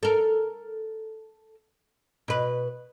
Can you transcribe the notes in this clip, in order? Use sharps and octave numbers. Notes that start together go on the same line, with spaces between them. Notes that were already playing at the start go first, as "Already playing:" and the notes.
A4 A#4
B2 B4